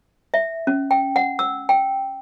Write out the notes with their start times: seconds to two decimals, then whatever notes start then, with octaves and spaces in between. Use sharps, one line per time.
0.34 E5
0.67 C#4
0.91 G5
1.16 F#5
1.39 E6
1.69 G5